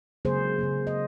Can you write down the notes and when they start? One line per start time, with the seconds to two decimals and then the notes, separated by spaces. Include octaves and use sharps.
0.25 C#3 F#3 A#3 G#4 C5
0.59 C#3 F#3 A#3
0.87 D#5